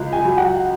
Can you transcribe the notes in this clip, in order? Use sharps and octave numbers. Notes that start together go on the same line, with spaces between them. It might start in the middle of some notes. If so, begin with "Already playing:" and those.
Already playing: C#2
G#5
F#3
F#5